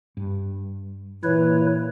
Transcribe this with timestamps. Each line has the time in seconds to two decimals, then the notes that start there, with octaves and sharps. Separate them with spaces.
0.17 G2
1.24 A#2 E3 E4 B4 C#5